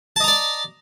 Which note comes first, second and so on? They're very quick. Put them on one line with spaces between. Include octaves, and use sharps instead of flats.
A5 D#5 A#5 D5